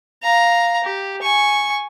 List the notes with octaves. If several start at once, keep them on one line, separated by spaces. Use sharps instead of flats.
F5 A#5
G4
G#5 C#6